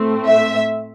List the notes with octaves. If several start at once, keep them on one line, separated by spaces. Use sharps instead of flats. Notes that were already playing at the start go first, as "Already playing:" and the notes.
Already playing: A2 A3 C4
E5